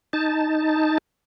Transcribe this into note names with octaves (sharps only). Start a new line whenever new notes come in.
D#4 A5